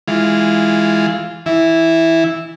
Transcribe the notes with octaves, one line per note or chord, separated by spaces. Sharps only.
E3 G#3 F4
E3 E4